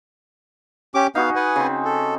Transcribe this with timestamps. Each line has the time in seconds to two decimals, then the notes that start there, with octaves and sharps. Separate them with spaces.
0.95 C#4 G4 D6
1.15 B3 D#4 F#4 G#4 F5
1.36 B4 F#5 G#5
1.56 C#3 C4
1.85 A4